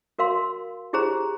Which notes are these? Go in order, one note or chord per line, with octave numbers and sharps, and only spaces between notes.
F#4 A#4 F5 C6
E4 G4 G#4 C5 A#5